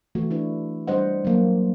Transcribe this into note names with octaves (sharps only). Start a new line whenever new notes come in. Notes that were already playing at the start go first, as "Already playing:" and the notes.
E3 A3 F#4
D4 E4 B4
G3 D4 C5 D#5 F#5
F#3 A#3